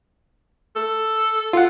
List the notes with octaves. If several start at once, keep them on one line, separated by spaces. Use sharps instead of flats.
A4
F4 F#5